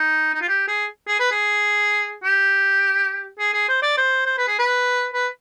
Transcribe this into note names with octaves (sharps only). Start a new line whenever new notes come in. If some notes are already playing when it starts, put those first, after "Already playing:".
Already playing: D#4
D#4
F4
G4
G#4
G#4
B4
G#4
G4
G#4
G#4
C5
D5
C5
C5
B4
G#4
B4
B4